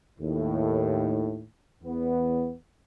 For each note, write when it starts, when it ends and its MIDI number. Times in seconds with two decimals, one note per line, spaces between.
0.20 1.44 39
0.20 1.44 45
1.83 2.53 40
1.83 2.53 59